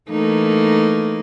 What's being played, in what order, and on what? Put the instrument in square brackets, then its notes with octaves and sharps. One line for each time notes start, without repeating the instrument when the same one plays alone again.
[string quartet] E3 A3 A#3 D#4